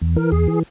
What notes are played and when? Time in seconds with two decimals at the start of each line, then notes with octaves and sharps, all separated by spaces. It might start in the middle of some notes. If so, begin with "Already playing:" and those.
0.02 E2
0.16 E3 A#4
0.32 E2 G#4
0.48 E3